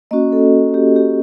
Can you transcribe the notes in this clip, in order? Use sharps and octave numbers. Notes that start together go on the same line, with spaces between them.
A#3 C#4 F#4 D#5
A4
G4
G4